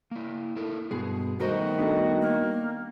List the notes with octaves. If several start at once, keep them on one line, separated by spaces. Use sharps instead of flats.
A#3 E4
E4 A4 A#4
G2 B2 G#3 G#4
D#3 G3 A3 B3 F#4 A#4 C5 D#5
B3 D4 A4
A#3